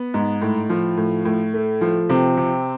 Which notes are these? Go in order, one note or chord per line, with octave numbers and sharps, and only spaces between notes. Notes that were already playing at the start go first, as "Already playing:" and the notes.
Already playing: B3
G#2
A2
F3
A2
A2
A3
F3
C3 C4
C3